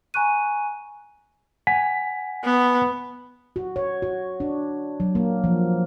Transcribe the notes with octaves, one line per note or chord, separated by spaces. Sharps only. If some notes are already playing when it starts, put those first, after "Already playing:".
G#5 A#5 C#6 F#6 D#7
F#5 G#5 B6
B3
F#4
C#5
F#4
D4
F#3
A#3
F3